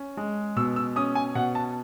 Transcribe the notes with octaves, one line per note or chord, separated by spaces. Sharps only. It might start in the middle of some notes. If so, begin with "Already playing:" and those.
Already playing: C#4
G#3
B2 E6
E6
C#4 D#6
G#5
B2 F#5
A5